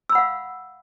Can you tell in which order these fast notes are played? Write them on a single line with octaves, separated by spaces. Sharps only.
E6 B5 F#5 F5